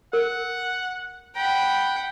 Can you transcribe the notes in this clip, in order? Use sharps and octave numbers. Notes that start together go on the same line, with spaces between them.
A#4 F#5
F#5 G5 B5